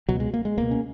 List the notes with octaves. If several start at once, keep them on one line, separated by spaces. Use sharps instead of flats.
C#2 B2 F#3
G#3
A#3
G#3
C#2 B2 A#3
C#4